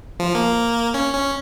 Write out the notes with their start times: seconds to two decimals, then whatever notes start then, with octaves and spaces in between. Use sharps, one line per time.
0.20 F3
0.35 A#3
0.94 C#4
1.13 C#4